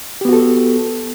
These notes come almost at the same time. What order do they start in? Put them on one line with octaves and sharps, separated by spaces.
G4 B3 F#4 A4